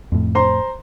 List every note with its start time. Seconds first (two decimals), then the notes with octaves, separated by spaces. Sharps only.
0.12 F2 A2
0.35 C5 A#5 C6